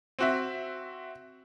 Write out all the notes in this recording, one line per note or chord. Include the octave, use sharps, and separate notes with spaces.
C4 F#4 E5